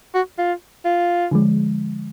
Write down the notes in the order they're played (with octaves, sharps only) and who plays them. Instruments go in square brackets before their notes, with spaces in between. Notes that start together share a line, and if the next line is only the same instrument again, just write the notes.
[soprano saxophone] F#4
F4
F4
[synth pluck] D3 F3 G#3